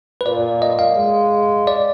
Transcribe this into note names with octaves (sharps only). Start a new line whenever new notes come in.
B4
A#2 D5
D#5
F5
G#3
D5